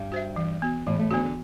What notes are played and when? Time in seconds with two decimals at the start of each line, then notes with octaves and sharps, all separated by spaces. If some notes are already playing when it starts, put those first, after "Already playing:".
Already playing: G2 G3
0.12 F#4 C5 E5
0.36 E3
0.62 B3 F#4
0.86 A2 E3 A3
0.99 A2 A3
1.11 D2 D3 B3 F#4
1.24 D3